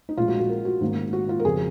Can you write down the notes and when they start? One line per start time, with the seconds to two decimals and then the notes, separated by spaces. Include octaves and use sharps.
0.09 D#4
0.17 A#1 A#2 G#3 C#4 F4
0.28 F#4
0.39 F#4
0.49 A#4
0.65 F#4
0.81 G#2 D#3 A#3 C#4
1.13 F#4
1.29 F4
1.39 A#4
1.44 F2 C#3 F3 G#4